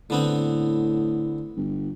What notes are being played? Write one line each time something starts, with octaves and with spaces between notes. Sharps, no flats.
A2 D3 B3 C4
G1